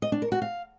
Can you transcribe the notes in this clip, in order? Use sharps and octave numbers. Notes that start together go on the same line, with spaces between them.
D#5
D4
A#4
F#4
F5